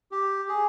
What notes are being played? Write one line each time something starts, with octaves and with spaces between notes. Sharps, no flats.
G4
G#4